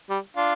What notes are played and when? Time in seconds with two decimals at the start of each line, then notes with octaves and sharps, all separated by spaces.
0.10 G3
0.37 D4 F4